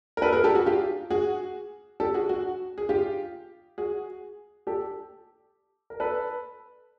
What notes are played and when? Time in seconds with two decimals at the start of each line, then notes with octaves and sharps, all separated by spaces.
0.17 A#4
0.22 A4 B4
0.33 G#4 A#4
0.44 G4 A4
0.55 F#4 G#4
0.66 F4 G4
1.10 F#4 G#4
2.00 G4 A4
2.14 F#4 G#4
2.29 F#4
2.78 G#4
2.89 F4 G4
3.78 F#4 G#4
4.67 G4 A4
5.90 A#4
6.00 A4 B4